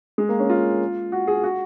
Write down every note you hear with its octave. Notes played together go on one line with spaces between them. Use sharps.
G#3
A#3
C#4
F4
F#4
G#4
F#4